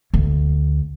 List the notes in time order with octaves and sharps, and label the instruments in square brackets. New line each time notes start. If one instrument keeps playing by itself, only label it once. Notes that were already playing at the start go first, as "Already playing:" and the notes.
[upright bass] D2